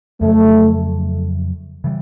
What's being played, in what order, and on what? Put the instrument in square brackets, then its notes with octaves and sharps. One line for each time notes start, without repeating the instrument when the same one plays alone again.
[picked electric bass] F2 C#3 F#3 [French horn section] A3
[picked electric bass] C#3 E3 G3